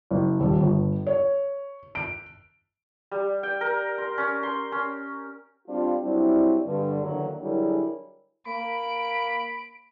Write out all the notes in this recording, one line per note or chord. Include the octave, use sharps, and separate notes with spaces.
F#1
D#1
G1
C#5
D7
G3
G5
A#4
C6
C#4
C6
C#4
G3 C4 D4 F4
F#3 G3 C4 D4 E4
G2 D3 G3
E2 D3 D#3 F#3 A#3
D3 F#3 G3 E4 G#4 A#4
A#3 B5 D7